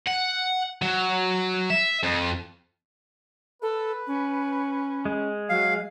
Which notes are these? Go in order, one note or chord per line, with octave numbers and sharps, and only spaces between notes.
F#5
F#3
E5
F2
A4 B4
C#4
G#3
F#3 F5